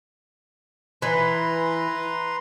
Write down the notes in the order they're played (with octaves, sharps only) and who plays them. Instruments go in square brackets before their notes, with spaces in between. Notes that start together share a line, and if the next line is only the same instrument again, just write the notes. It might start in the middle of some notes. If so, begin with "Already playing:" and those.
[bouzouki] E3 [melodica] B4 A#5 C6